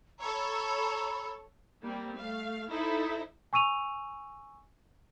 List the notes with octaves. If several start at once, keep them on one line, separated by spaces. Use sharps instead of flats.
A4 C#5 A#5 B5 E6
G3 A#3 C4
A3 F5
D#4 E4 A4 C5 E5
G#5 C#6 E6 D#7 F7